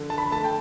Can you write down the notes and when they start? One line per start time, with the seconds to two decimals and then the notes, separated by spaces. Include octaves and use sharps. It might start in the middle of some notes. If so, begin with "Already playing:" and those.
Already playing: D3 F3
0.10 A5
0.18 B5
0.31 A3 A5
0.44 G5